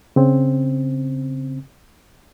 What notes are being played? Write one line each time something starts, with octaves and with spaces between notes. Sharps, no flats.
C#3 C4